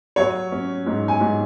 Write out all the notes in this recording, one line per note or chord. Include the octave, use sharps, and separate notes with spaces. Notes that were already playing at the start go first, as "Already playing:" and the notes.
F#3 C#5
C#4
G#2
G#5
G#2